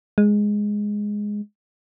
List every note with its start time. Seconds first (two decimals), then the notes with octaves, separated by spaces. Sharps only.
0.18 G#3